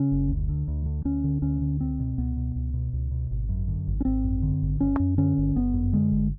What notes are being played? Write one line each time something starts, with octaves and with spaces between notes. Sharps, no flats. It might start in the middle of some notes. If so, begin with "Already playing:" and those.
Already playing: C#3 C#4
F#1
D2
D3
D2
D3
D2 C#4
D3
D2 C#4
D3
C#2 C4
B2
C#2 B3
B2
C#2
B2
C#2
B2
G#1
F#2
D3
G#1
C#4
G#1 C4
F#2
D3
G#1
G1 C#4
F#2
D3 C#4
G1
G1 B3
F#2
D3 G#3
G1